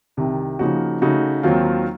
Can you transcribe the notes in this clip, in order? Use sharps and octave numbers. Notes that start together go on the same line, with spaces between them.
C2 C3 D#3
C#3 F3 A#3 D#4 F#4
C#3 A3 D#4 F#4
D#2 D#3 F#3 C4 F4